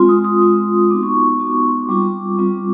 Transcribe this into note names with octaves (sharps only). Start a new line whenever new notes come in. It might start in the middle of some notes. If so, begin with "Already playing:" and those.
Already playing: G#3 C4 F4 C6
D#6
D#6
G#3 C4 F4
B3 D#4 F#4 D6
C#6
C6
C#6
B3 D#4 F#4
C6
C#6
G3 C4 F4 D6
G3 C4 F4